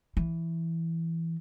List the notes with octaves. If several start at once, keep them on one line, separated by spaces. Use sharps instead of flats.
E3